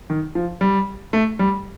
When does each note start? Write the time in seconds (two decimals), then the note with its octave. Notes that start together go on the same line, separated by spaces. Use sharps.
0.10 D#3
0.35 F3
0.61 G3
1.13 A3
1.39 G3